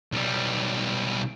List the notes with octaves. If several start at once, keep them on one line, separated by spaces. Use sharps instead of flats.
B1 G3